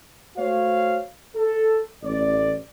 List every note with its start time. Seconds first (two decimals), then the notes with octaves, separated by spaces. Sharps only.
0.37 A3 F#4 C5 C#5 F5
1.35 A4
2.03 A1 D5